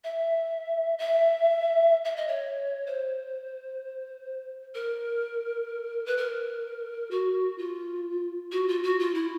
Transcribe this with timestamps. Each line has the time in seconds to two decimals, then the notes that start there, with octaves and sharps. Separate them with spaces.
0.04 E5
0.98 E5
2.05 E5
2.16 D#5
2.27 C#5
2.86 C5
4.75 A#4
6.06 B4
6.17 A#4
7.11 F#4
7.58 F4
8.52 F#4
8.68 F4
8.83 F#4
8.99 F4
9.14 E4